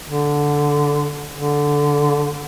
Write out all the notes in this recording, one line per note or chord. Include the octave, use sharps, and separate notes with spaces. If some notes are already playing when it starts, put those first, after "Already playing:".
D3
D3